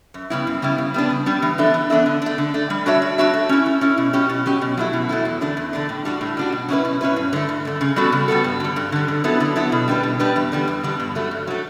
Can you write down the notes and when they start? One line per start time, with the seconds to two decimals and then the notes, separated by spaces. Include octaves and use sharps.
0.14 F#2
0.30 C#3 G3 B3 E4
0.47 F#2
0.62 C#3 G3 B3 E4
0.78 C#3
0.94 G3 B3 D4
1.10 C#3
1.26 G3 B3 D4
1.42 E3
1.58 B3 D4 A4 E5
1.74 E3
1.90 B3 D4 A4 E5
2.06 D3
2.22 A3 D4
2.38 D3
2.54 A3 D4
2.70 G3
2.86 D4 F#4 C#5 E5
3.02 G3
3.18 D4 F#4 C#5 E5
3.34 A3
3.49 C#4 E4
3.66 A3
3.81 C#4 E4
3.97 B2
4.13 F#3 C#4 G4
4.29 B2
4.46 F#3 C#4 G4
4.61 B2
4.77 F#3 A3 E4
4.93 B2
5.09 F#3 A3 E4
5.25 E2
5.41 D3 A3 D4
5.57 E2
5.73 D3 A3 D4
5.89 A2
6.05 G3 D4 F#4
6.21 A2
6.37 G3 D4 F#4
6.52 B2
6.69 F#3 C#4 E4 B4
6.85 B2
7.01 F#3 C#4 E4 B4
7.16 G2
7.33 D3 A3
7.49 G2
7.65 D3 A3
7.81 C#3
7.96 G3 B3 F#4 A4
8.12 C#3
8.28 G3 B3 F#4 A4
8.44 G2
8.60 D3 G3
8.76 G2
8.92 D3 G3
9.08 D3
9.24 F#3 B3 E4 A4
9.40 D3
9.56 F#3 B3 E4 A4
9.72 B2
9.88 G3 D4 G4 B4
10.03 B2
10.19 G3 D4 G4 B4
10.36 E2
10.52 D3 G3 B3
10.67 E2
10.83 D3 G3 B3
11.00 G2
11.15 F#3 A3
11.31 G2
11.47 F#3 A3